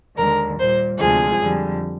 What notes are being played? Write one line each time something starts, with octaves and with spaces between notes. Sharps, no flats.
D#2 D3 G#3 A#4
A#2 G3 C5
D2 C3 F3 G#3 G#4
F2 D3 G3